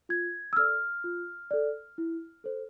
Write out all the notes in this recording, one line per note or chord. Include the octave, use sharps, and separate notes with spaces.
F4 G#6
E6
A4 D5 F6
F4
A4 D5
E4
A4 C5